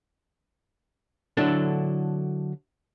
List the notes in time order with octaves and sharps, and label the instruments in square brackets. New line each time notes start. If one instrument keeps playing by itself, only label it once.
[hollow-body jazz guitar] D3 F#3 D4 E4 A4